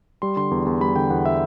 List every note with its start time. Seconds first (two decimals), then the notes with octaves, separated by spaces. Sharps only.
0.22 G3 C6
0.37 D3 C6
0.51 E2
0.66 E2
0.81 G3 B5
0.96 D3 G5
1.10 E2 F#5
1.26 E5